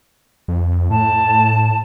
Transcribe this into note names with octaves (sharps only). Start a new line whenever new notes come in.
F2
A2 A5